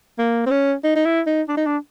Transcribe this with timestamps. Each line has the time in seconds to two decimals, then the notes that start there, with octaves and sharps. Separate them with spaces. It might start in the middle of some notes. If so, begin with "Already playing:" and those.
0.18 A#3
0.46 C4
0.51 C#4
0.84 D#4
0.96 D#4
1.06 E4
1.27 D#4
1.49 D4
1.57 D#4
1.66 D4